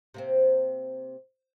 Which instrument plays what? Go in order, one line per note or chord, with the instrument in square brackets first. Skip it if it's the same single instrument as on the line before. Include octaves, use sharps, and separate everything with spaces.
[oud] C3 A#3 C4